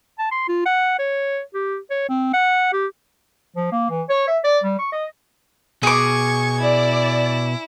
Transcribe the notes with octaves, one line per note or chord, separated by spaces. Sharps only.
A5
C6
F4
F#5
C#5
G4
C#5
C4
F#5
G4
F3
A#3
E3
C#5
E5
D5
G3
C#6
D#5
B2 G#4 C#6 D6 G#6
E4 D5